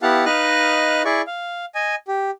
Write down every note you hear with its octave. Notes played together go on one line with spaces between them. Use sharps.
B3 E4 G4 F5 F#5 A5
D#4 B4 D#5 F5 F6 F#6
E4 G#4 D5 C#6
F5
D#5 G#5
G4